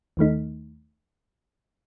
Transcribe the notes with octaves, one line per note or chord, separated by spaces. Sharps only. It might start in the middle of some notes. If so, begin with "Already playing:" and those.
D#2 D#3 A3 D#4